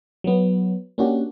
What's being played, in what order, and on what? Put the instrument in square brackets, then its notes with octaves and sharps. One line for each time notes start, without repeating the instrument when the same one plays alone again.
[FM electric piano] F#3 B3
A#3 C#4 D4 F#4 G4